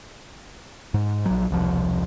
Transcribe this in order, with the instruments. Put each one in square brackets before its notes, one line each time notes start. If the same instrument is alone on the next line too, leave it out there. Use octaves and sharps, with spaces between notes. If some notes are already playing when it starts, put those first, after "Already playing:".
[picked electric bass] G#2
A#1 F#3
E1 C2 F3